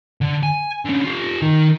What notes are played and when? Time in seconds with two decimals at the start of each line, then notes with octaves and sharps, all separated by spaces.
0.21 D3
0.43 G#5
0.85 D3 C#4
1.05 F4 G4
1.42 D#3 D#4